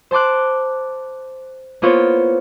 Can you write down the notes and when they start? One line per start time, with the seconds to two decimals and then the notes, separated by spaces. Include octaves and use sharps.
0.11 C5 A5 C6 D6 F#6
1.82 A#3 B3 E4 F4 C5 C#5